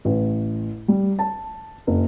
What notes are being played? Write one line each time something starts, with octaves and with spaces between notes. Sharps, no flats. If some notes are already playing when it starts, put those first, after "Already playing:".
A1
G3
A5
F#1